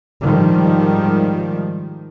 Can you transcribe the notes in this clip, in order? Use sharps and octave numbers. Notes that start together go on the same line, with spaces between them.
G#2 D#3 F3 G3